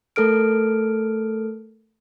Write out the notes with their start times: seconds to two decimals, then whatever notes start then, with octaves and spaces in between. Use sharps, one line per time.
0.16 A3 A4 A#4 F6 D7